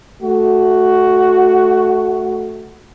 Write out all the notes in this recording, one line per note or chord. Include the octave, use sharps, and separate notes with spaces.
A3 F#4